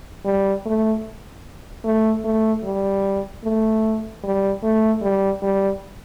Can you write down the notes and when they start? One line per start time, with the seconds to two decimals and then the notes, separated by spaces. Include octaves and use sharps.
0.25 G3
0.65 A3
1.85 A3
2.25 A3
2.64 G3
3.44 A3
4.24 G3
4.63 A3
5.02 G3
5.42 G3